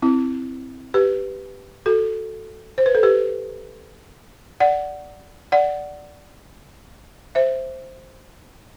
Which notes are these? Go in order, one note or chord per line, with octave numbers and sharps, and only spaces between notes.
C4 E4
G4 B4
F#4 A4
C5
B4
A4
G4 B4
D5 F#5
D5 F#5
C5 E5